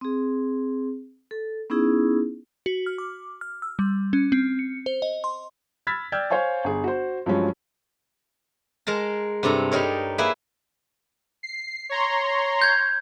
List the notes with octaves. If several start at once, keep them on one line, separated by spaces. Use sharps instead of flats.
C4 G#4
A4
B3 C#4 D#4 E4 G#4
F#4
F6
D6
F6
E6
G3
C#4
C4
C#7
C5
D#5
C6
B5 E6 F6 G#6 A6 B6
D5 G5 E6 F6 G6 G#6
C5 C#5 F5 G#5 C#6
G1 G#4
F#4 C5
G2 F3 F#3 G#3 C#4
G#3 A#4 A5 A#5
G2 C3 A4 A#5
G3 D#4 A#4 C#5
A#3 E4 G#4 B4 E5
C7
C#5 A#5 C6
G6 G#6